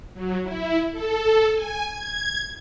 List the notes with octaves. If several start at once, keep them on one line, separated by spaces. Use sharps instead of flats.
F#3
E4
A4
G#5
G#6